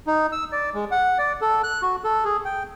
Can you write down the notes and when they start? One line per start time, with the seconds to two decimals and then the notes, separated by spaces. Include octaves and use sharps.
0.07 D#4
0.32 E6
0.52 D5
0.74 G#3
0.91 F#5
1.18 D5
1.41 A4
1.64 F#6
1.82 F#4
2.04 A4
2.25 G#4
2.45 G5